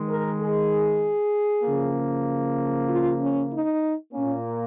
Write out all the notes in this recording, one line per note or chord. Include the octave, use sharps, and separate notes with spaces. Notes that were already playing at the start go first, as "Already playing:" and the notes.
Already playing: D#3 G#3
A#4
G#4
C#3 F3 A#3
F4
C#4
D#4
A#2 A#3 C#4